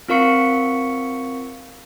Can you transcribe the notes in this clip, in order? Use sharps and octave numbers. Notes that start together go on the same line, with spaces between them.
C4 F4 A#4 F5 C#6 C#7